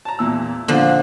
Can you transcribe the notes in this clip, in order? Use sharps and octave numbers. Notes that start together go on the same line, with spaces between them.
A5 A#5
E2 A#2 E6
A#2 D3 F3 D4